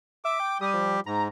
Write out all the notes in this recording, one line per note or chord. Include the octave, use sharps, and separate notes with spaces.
E5 D6
G5
G3 G4 D#6
F3
G#2 A#5